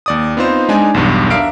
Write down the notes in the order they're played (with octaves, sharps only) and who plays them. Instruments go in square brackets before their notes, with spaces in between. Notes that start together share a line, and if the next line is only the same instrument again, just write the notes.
[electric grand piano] D#2 D5 D#6
B3 C4 D#4 F4 C5
G#3 D4 D#4 G#5
B1 E2 G2
D4 A#4 E5 F5 D7